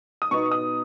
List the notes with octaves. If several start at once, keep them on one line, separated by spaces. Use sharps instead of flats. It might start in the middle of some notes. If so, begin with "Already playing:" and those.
D#6
B2 B3 D#4 C#6
D#6